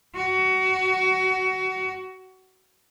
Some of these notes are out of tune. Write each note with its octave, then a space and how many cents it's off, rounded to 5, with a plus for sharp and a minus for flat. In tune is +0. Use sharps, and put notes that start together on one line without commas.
F#4 +25